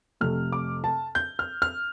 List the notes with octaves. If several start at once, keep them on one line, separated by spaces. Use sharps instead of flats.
F2 C3 A3 F6
D6
A5
G6
F6
F6